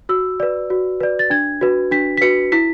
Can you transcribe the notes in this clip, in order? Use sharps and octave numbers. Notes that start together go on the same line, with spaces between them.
F#4 E6
B4 D5
F#4
B4 D5
A6
D4 G#6
F#4 B4
D4 B6
B6
F#4 B4 C#7
E4 B6